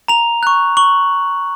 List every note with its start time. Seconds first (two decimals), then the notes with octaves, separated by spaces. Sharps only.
0.08 A#5 F7
0.43 C#6 F#6
0.77 C#6 F#7